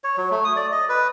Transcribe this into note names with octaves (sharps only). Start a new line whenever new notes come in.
C#5
F#3
A3
D#6
D5
D#5
B4